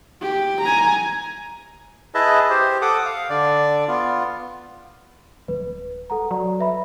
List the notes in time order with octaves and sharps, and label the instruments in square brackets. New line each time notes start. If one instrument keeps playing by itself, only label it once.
[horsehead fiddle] G4
G#5 A#5
[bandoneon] E4 G#4 B4 D#5 E5 A5
G4 C5
A4 F#5 D6 D#6
F5
D3 D5
B3 F4
[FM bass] D1 [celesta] B4
[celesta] A4 F#5 A#5
[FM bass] F#3 [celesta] D5
[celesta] B4 E5 B5